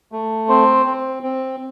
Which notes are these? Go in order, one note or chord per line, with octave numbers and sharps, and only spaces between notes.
A3
C4 C5
C4
C4